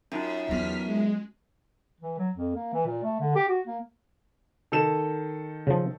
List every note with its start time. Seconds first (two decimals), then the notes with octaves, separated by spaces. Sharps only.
0.12 F#2 C#4 D#4 F4
0.48 E2 F#3 B3 F6 B6
0.85 G#3
2.00 E3
2.18 F#3
2.36 F2
2.55 A#3
2.73 E3
2.86 A#2
3.03 A3
3.20 D3
3.36 G4
3.48 F#4
3.67 A#3
4.72 D#3 A4 E7
5.67 C#3 F3